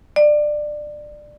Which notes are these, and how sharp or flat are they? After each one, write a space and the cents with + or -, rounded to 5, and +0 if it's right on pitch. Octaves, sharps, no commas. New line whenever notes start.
D5 +20